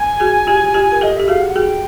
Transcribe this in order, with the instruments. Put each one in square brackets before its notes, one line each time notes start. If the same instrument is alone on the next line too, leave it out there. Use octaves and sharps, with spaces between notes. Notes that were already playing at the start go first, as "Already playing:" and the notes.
Already playing: [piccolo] G#5
[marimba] F#4 G#4
F4 G4
F4 G4
A#4
[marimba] G4 A4 [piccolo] D#5
[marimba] G4 [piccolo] E5
[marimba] F#4 G#4 [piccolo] F5
[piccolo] F#5
[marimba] F#4 G#4 [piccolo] G5